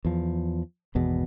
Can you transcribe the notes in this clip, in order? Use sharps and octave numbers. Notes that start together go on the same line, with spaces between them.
E2 F3
G#1 E2 B2